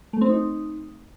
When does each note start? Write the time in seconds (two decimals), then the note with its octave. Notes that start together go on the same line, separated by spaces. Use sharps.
0.13 A3
0.21 C4
0.29 D#4